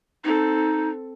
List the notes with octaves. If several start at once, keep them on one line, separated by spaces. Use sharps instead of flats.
C4 D#4 A4